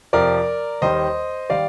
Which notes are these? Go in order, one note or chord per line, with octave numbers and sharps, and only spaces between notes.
F2 C3 F3 A#4 D5
D#2 D#3 G3 C5 D#5
D#3 G3 D5 F5